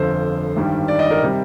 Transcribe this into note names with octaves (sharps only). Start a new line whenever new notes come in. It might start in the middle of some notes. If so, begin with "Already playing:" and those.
Already playing: G1 F2 D3 C5
G#1 G2 D#3 G3
D5
D#5
A#4
C3 G3